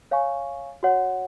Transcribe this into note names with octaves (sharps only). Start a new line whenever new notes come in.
C#5 F5 G#5 C#6
F#4 C#5 F#5